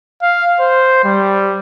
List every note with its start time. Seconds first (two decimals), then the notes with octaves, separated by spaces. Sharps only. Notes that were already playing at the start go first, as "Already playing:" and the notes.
0.22 F5
0.60 C5
1.04 G3